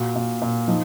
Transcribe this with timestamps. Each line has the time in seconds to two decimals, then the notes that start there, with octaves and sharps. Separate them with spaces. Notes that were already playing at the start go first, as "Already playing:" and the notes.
Already playing: A#2 F#4
0.16 A#2
0.42 A#2
0.68 F3 D#4